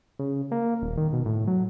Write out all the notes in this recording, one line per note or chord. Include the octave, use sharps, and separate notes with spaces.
C#3
A#3
D#1
D#3
B2
A2
F#3